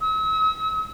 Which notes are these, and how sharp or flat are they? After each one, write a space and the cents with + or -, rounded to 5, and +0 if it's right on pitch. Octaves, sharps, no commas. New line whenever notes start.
E6 -45